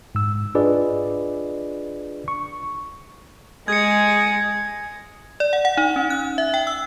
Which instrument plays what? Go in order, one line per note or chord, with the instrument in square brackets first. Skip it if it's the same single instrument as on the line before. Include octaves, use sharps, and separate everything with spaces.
[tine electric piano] G#2 E6
D4 F4 G#4 B4 D5 D#5
C#6
[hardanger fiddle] G#3 [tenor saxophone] G#4 [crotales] G#6 C#7
[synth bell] D5
F#5
F#5
D#4
C#4
F#6
E5
G5
E6